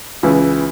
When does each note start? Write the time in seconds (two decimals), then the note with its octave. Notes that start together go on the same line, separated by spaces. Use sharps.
0.23 C#2 C#3 E3